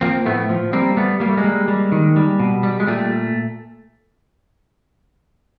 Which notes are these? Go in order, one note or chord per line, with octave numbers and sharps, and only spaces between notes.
F3 A#3 C4
A2 A3 B3
F3
G3 A#3 C4
G3 A3 B3
G3 A#3
A3
G#3 A#3
G3
G3
D#3
G3
B2
G3
G#3
A#2 G3 A3